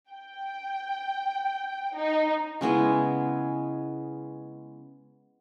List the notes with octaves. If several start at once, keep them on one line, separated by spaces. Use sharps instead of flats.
G5
D#4
C#3 G#3 B3 E4